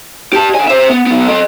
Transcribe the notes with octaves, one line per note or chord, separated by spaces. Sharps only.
G4 A5
D3 G#5
C5 E5
B3
F#3 B3
A4 D#5